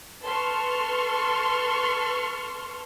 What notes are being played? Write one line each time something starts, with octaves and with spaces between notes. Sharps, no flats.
A4 B4 A5 C6 C#6 F6